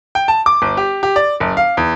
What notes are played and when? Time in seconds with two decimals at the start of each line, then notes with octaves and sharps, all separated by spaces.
0.15 G5
0.28 A5
0.46 D6
0.62 G1
0.77 G4
1.03 G4
1.16 D5
1.40 F#1
1.57 F5
1.77 E2